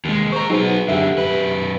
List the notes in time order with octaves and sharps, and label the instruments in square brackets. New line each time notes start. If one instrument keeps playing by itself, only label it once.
[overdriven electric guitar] D#2 G#3
[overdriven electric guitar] C5 A#5 [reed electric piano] C#6
[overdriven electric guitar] F#3 B3 [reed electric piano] D#4 G#4 C5
[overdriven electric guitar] F#2 D3 [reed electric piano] G4 E5
[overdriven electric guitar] F#2 B4